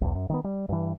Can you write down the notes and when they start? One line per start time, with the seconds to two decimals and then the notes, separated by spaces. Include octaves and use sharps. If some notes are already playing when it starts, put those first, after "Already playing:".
0.01 B1 E2
0.15 F#2
0.29 D#3 F#3 B3
0.44 G3
0.69 G2 E3